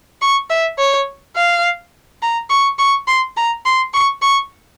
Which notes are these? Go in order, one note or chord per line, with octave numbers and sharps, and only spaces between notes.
C#6
E5
C#5
F5
A#5
C#6
C#6
C6
A#5
C6
C#6
C#6